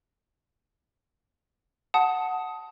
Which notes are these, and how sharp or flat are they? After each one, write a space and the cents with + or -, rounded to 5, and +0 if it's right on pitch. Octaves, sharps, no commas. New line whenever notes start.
F#5 +0 A5 +0 D#6 +15